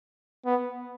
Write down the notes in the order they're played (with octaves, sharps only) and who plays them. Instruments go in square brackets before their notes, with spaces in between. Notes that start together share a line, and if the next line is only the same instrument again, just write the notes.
[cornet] B3